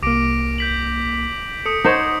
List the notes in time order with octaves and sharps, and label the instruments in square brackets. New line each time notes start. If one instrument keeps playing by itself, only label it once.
[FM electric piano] C2 A#3 [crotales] D6 A#6 D7
[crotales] G6 B6 F#7
[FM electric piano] A4 [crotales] D#6 C#7
[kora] D#4 C5 C#5 [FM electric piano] F#5 [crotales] C#7